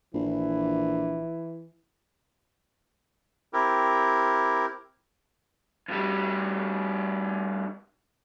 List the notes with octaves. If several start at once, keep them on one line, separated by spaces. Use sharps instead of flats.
A#1 E3
C4 E4 G4 A#4
F2 G3